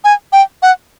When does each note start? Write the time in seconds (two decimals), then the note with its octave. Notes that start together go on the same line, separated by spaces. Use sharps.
0.04 G#5
0.33 G5
0.62 F#5